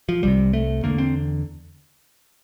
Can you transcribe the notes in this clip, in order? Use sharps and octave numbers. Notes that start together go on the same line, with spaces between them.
F3
C2 C3 G3
A3
E2 D3 A#3
C4